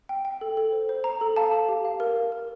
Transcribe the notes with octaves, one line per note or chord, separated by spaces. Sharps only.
G5
G5
A4
A4
C5
C5
C5 A#5
A4
F5 A5
A4
G4
F5
A#4
A#4
A#4